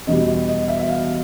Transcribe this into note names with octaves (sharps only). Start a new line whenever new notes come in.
E2 B2 G3 D#5
D#5
D#5
E5
E5
F5